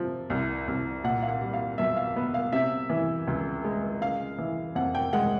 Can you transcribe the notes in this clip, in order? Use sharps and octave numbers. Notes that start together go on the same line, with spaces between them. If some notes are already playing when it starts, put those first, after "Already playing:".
Already playing: C3 F3
C2
C2
A#2 F#5
F5
F#5
G3
F5
B1 E5
F5
B3
F5
C3 E5
E3
C#2
G#3
C#3 F5
E3
F2 F#5
G5
G#3 F#5